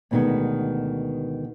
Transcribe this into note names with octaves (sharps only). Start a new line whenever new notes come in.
D2 B2 D#3 G#3 B3